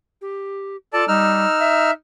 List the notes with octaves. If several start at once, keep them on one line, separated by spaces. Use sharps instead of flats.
G4
F4 A4 D5 A5
G3 D#4 E6 F6
E5